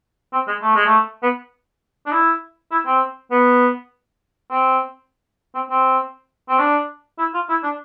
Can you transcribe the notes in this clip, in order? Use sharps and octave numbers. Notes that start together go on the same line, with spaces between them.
C4
G#3
A3
G#3
A3
B3
D4
E4
E4
C4
B3
C4
C4
C4
C4
D4
E4
F4
E4
D4